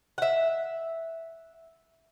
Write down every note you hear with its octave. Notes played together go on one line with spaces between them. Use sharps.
E5 F#5